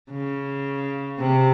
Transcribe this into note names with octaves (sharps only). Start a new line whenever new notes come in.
C#3
C3